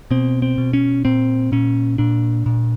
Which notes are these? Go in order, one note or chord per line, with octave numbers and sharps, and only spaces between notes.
B2 C4
C4
B2
C#4
A#2 C4
A#2 C#4
A#2 D4
A#2